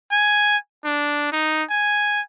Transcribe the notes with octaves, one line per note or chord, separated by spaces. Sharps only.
G#5
D4
D#4
G#5